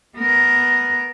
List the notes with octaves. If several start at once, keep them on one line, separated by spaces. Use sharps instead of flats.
B3 A#4